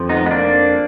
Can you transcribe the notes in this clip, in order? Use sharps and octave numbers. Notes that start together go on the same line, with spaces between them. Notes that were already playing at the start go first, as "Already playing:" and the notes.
Already playing: F2 F3
B3 D#4
B3
A#3 D4